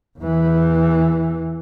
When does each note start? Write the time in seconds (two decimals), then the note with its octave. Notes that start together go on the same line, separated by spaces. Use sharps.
0.19 E2 E3